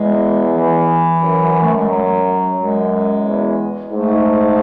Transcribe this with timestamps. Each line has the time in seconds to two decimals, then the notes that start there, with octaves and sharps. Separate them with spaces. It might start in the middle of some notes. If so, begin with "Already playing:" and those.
Already playing: E2 G#3
0.55 E3
1.22 F#2
1.62 A3
1.76 G#3
1.90 F#3
2.57 F#2 G#3
3.25 E2
3.91 G#2 A3